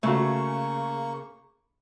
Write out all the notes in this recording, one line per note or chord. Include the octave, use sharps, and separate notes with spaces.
C#3 A3 A#3 F#4 C#6